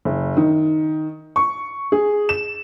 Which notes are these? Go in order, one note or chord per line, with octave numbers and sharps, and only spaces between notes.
F#1
D#3
C#6
G#4
E7